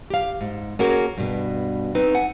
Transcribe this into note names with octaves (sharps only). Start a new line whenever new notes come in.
G4 F5
G#2
A#3 C#4 F#4 G#4 A#4
G2 B2
C4 D#4 B4
F#5 G#5